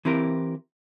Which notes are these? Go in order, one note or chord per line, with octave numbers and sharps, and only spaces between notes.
E3 C4 E4 G4 A#4